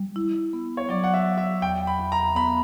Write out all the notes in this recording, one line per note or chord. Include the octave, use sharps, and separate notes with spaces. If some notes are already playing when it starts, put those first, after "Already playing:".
Already playing: G3
E4
B3
C#5
F#3 D5
F#5
E5
F#3
E5
E2 G5
B5
E2
A#5
B3 B5